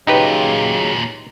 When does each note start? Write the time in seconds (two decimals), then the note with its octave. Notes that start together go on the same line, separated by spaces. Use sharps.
0.07 D#2 A#2 C#3 F#3 D#4 G4 B4